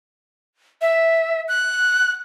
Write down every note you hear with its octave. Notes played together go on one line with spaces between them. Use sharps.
E5
F#6